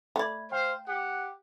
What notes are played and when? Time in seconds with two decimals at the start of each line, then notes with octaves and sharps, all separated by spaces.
0.16 A3 D5 E5 B5 G#6
0.52 C5 F5 G5
0.87 G4 F#5